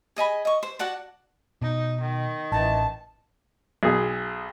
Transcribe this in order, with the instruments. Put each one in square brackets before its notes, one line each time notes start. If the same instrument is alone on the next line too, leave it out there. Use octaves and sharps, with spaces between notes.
[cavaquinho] G#4 D#5 G#5 B5
D#5 C#6
C5
F#4 D5 F#5 A5
[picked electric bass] B2 [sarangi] D#4
[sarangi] D#3
[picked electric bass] A1 [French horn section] E3 D#5 [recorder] A5
[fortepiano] B1 G#4